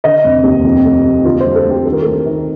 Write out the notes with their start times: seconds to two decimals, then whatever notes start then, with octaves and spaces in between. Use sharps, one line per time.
0.04 D3 D#5
0.24 F1
0.44 D#2
0.64 F2
0.85 A3
1.05 F2
1.25 D3 F4
1.40 C5
1.46 G3
1.55 A4
1.66 D2 G4
1.85 D#3 A4
1.93 A#4
2.02 D2 A4
2.26 D#3